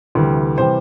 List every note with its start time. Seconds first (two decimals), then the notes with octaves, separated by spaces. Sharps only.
0.15 D2 C3 E3 G3
0.58 C3 E3 G3 C5